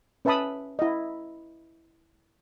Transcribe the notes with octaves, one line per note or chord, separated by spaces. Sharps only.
C#4 B4 E5 A5 B5 D#6
E4 D#5